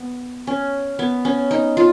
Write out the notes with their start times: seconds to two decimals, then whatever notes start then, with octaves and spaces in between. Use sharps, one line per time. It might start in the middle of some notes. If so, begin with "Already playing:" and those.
Already playing: B3
0.47 C#4
0.99 B3
1.25 C#4
1.51 D#4
1.77 F4